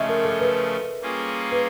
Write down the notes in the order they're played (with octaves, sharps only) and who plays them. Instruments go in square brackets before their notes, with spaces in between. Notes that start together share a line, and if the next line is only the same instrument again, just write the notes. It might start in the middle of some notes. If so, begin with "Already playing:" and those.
Already playing: [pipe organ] C#3 F3 A3 C#4 F4 [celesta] D#5 E5
[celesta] A#4
A4
B4
[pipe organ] G3 A#3 C#4 F4 G#4
[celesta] B4